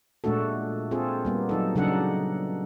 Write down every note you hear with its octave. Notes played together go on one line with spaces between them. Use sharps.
A#2 G#3 A3 D4 F#4 A4
C4 F4 G#4 A4
G3 A#3 B3
F#3 D#4 A4
C#3 F#3 D4 D#4 A4 F#5